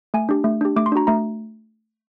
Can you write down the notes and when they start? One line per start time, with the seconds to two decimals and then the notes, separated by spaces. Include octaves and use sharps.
0.14 A3 G#5
0.29 D4 G4
0.44 A3
0.61 D4 G4
0.76 A3 D6
0.86 C6
0.92 D4 F#4 A#5
1.07 A3 A#5